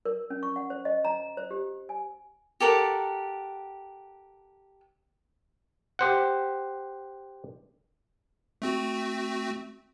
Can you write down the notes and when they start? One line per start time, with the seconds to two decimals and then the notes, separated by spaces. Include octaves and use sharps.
0.05 A#4
0.30 C#4
0.43 C#6
0.56 F#5
0.70 C5
0.85 D#5
1.05 A#5
1.37 C5
1.51 G4
1.89 G#5
2.60 G4 A4 A#4 F#5
5.99 G4 C5 F#5
8.62 A3 C4 F#4